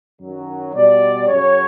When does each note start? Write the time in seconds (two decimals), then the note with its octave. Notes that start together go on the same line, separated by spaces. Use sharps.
0.20 F#2 D#3 F#3
0.74 B2 G3 D5
1.28 F#2 C#3 F#3 C#5